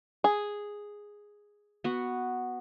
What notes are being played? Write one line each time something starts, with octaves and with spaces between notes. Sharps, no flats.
G#4
B3 F#4